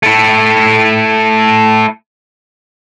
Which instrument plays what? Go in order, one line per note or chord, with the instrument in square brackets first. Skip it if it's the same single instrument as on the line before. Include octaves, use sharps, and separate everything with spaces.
[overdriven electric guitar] A3 E4